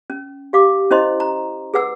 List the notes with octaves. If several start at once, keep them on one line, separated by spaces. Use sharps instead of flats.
C#4
G4 F5 D6
C#4 E4 C5 D#5 C6
A#5
G#4 B4 F#5 E6